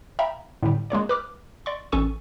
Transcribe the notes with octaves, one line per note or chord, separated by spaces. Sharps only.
E5 F5 G5 A#5 B5
A2 D3 G3
G#3 A#3 C#5 D5
B4 D6 F6
D5 C6 C#6
A1 C#4 A4 C#6 D#7